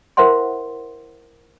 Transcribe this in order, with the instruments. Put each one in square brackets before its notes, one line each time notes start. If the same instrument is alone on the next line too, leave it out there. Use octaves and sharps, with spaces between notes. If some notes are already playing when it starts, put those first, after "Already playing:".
[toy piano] E4 A#4 C5 E5 F#5 C6